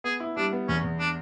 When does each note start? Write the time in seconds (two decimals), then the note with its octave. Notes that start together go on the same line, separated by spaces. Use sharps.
0.04 B3 G#4
0.20 E4
0.36 G3 D4
0.53 B3
0.68 E2 C#4
0.84 E2
0.99 D4